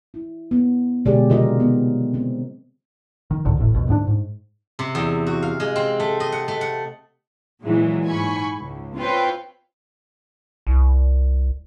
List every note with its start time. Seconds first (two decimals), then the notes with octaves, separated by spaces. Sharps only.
0.14 E4
0.51 B3
1.05 B2 D3 G#3 G4 G#4 D5
1.30 C3 D#3 F#3 F4 A#4 D#5
1.60 B3
2.14 C4
3.31 D#3
3.45 C#2 G#2 D3 D#3
3.57 E1 A1 A2
3.72 A#1 D#2 B2
3.87 D2 G#2 B3 D4
4.07 G#2
4.79 C3
4.95 E2
5.27 F#4
5.42 F5
5.60 G#3
5.76 C4
6.00 A3
6.20 D#5
6.32 F#5
6.48 A3
6.61 F#5
7.64 A#2 E3 F#3 G#3
8.06 G#2 G#5 B5 C#6
8.56 C#2
8.96 C4 F4 B4 C#5 G5 C6
10.67 C2